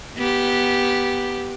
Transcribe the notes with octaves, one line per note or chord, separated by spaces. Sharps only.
B3 G4